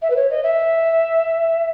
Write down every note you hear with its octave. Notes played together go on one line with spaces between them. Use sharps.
E5
B4
C#5
D#5
E5